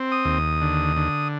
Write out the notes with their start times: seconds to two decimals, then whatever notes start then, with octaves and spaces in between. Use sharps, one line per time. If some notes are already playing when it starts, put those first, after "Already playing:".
Already playing: C4
0.12 D#6
0.25 D#2
0.61 D3
0.96 D3